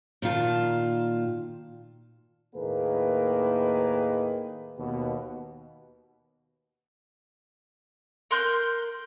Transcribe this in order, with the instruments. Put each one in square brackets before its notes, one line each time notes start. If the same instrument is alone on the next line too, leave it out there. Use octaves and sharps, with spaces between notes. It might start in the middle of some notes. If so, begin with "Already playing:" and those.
[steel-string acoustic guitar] A#2 D#3 F4 A5
[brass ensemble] D#2 A2 D#3 A#3 G#4 B4
D#2 B2
[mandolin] A#4 C6 F#6 G6